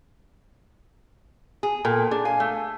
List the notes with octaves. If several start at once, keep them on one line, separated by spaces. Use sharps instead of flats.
G#4
A#2 A4 A#4 G5
D4 G#4
F5 G#5
A3